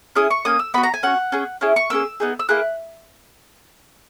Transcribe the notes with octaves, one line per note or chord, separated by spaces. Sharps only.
C#4 E4 G#4 D#6
C#6
A#3 C#4 D#6
E6
B3 F#4 B5
A#5
G#5
C#4 F#4 F#5
C#4 G#4
C#4 E4 G#4
C#6
A#3 C#4 G#4 E6
B3 D#4 G#4
E6
A#3 E4 G#4 F#6